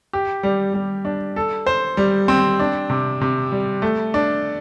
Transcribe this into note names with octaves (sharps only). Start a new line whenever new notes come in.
G4
G3
G3
D4
A4
C5
G3
C4
D4
C3
C3
G3
A3
D4